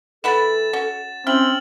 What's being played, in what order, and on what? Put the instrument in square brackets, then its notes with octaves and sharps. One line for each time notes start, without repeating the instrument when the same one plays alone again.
[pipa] E3 B3 B5 [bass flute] A4 [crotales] A6 E7
[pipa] C#4 F#4
[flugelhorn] C4 [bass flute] C#4 [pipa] E4 [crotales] F6 F#7